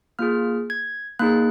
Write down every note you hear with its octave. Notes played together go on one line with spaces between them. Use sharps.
A#3 F4 G#4 F6
G#6
A#3 D#4 G#4 F#6